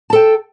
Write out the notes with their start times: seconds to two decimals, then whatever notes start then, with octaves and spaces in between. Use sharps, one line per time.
0.10 A5
0.13 A4
0.15 G5